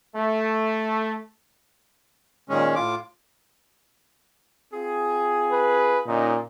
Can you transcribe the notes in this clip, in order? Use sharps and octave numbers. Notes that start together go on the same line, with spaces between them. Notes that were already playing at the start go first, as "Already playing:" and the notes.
A3
A#2 D#3 G#3 C#4
A2 F4 D6
C4 F4 G#4
B4
A#2 D3 C#4 D#4